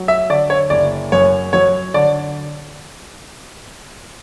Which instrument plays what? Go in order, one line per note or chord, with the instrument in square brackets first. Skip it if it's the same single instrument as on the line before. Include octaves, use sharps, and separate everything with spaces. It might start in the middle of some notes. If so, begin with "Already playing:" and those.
Already playing: [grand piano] F#3
E5
D3 D5
C#5
F#1 D5
F#2 C#5
F#3 C#5
D3 D5